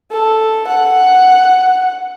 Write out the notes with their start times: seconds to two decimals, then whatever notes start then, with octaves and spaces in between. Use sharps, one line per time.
0.11 A4
0.68 F#5